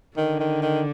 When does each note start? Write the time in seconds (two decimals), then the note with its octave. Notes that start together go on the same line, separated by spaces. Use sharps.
0.17 D3 D#3
0.40 D#3
0.62 D#3